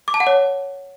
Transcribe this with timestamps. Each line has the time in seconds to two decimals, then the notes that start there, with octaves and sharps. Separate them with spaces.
0.08 D6
0.14 A5
0.20 F#5
0.27 C#5